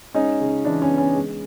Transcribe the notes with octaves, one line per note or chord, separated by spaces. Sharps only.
G#3 C#4 D#4
C#3
E3 D4
C#4
B3
C#4
G#3